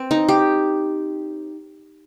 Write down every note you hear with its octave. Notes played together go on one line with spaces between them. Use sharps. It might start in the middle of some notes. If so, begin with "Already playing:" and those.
Already playing: C4
D#4
G4